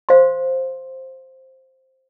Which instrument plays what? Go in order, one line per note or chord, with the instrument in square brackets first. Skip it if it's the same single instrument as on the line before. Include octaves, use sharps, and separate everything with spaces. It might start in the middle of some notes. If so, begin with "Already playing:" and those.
[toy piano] C5 F5 C6